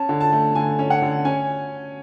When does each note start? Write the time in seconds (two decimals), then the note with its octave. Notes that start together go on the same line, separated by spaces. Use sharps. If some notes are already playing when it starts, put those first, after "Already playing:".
Already playing: C#4 A5
0.09 D3
0.21 A5
0.32 A3
0.55 D3 G#5
0.79 C#4
0.90 F#5
1.02 D3
1.25 C#4 G#5